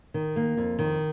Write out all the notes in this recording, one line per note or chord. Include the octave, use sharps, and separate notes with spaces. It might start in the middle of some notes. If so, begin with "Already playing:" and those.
D#3
A#3
F2
D#3